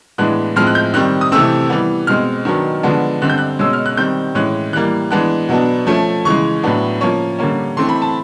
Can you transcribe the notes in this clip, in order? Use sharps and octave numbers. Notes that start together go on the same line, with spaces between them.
A2 E3 G#3 B3 D4 F#6
A2 F3 G#3 C4 F6
F#6
G6
D#3 G3 C4 F#6
D#6
C3 E3 A3 C4 E6
E3 G3 B3
B2 G#3 C4 F6
D#3 F#3 B3 D4
D3 F3 G#3 B3 D4
D3 G3 C4 F#6
G6
F#6
B2 G#3 C#4 E6
F6
F#6
D#3 G3 C4 G6
A2 E3 G#3 C#4 F#6
E3 G3 A#3 F#6
E3 G#3 B3 D4 F#6
B2 F#3 B3 D4
F3 A3 C#4
C#3 E3 G#3 C#6
A2 F#3 B3 D4
F3 A#3 C#4 C#6
D3 G3 A#3 C#4
E3 A3 C4 C6
B5
A5